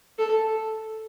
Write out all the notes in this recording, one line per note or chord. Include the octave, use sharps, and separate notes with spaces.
A4